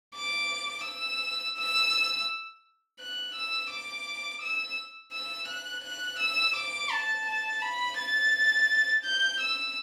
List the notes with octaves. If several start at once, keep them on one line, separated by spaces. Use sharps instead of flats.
D6
E6
E6
F#6
E6
D6
E6
E6
F#6
F#6
E6
D6
A5
A5
B5
A6
G6
E6